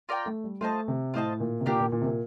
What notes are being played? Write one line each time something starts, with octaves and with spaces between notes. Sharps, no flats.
F4 A#4 D5 G5
A3
G3
A3 F4 C5 D#5 A5
C3
A2 F4 C5 D#5 A5
A#2
C3
A#2 D4 G4 A#4
A#2
A#2
C3
A#2